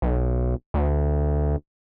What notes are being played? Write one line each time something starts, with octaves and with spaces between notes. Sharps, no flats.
B1
D2